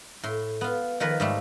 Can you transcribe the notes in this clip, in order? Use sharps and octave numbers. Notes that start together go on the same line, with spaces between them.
A2 C6
B3 F4
D#3 F3 A#4 B4
G#2 G3 A3